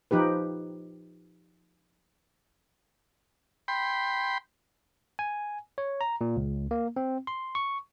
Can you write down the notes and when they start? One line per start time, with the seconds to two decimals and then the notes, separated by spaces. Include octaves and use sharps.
0.11 F3 D#4 G4 B4
3.68 G5 B5 C6
5.19 G#5
5.78 C#5
6.01 A#5
6.21 A#2
6.36 C#2
6.71 A#3
6.96 C4
7.27 C6
7.55 C#6